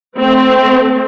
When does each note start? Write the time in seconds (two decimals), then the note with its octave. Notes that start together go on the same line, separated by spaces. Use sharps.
0.18 A3 C4